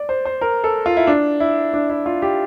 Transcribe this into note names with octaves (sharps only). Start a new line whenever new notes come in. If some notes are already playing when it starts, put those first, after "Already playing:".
Already playing: D5
C5
C5
A#4
A4
F4
E4
D4
E4
D4
E4
F4
G4